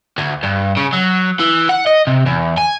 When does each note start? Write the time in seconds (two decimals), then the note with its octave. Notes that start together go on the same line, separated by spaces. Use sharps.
0.18 D2
0.43 G2
0.77 C#3
0.93 F#3
1.40 E3
1.69 F#5
1.86 D#5
2.07 C3
2.26 E2
2.57 G#5